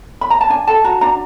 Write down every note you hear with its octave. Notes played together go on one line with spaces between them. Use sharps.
B5
A#5
A5
D4 G#5
A4 A5
F#4 A#5
D4 A#5